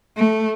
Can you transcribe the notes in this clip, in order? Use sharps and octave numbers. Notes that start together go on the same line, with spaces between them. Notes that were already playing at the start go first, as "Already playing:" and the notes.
A3